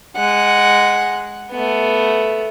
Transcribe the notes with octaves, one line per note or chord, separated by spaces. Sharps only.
G#3 F#5
A3 B3